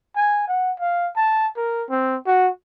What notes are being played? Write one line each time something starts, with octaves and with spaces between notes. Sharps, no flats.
G#5
F#5
F5
A5
A#4
C4
F#4